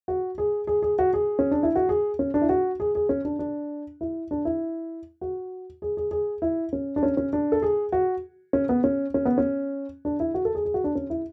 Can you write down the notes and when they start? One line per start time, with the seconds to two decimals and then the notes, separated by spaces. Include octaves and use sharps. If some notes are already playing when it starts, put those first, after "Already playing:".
0.08 F#4
0.38 G#4
0.67 G#4
0.83 G#4
0.99 F#4
1.14 G#4
1.39 C#4
1.51 D4
1.63 E4
1.76 F#4
1.89 G#4
2.19 C#4
2.34 D4
2.41 E4
2.49 F#4
2.80 G#4
2.95 G#4
3.09 C#4
3.25 D4
3.39 D4
4.01 E4
4.31 D4
4.45 E4
5.21 F#4
5.82 G#4
5.97 G#4
6.11 G#4
6.42 E4
6.73 C#4
6.96 D4
7.03 C#4
7.17 C#4
7.33 D4
7.52 A4
7.62 G#4
7.92 F#4
8.53 C#4
8.69 B3
8.84 C#4
9.14 C#4
9.26 B3
9.38 C#4
10.05 D4
10.20 E4
10.34 F#4
10.45 A4
10.55 G#4
10.65 G#4
10.74 F#4
10.84 D4
10.95 C#4
11.10 E4